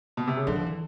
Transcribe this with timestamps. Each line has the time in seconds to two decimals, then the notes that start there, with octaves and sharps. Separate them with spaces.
0.17 B2
0.27 C3
0.37 C#3
0.47 D3 F#3
0.55 F3
0.66 E3